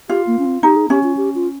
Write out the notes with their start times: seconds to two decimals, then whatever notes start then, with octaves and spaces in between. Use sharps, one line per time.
0.09 F4 G4
0.27 A#3
0.39 C#4
0.45 C4
0.63 D#4 G4
0.76 G#4
0.90 C#4 G4
1.03 F4
1.17 G4
1.35 F4